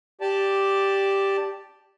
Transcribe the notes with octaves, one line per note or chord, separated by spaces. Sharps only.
G4 D5 A5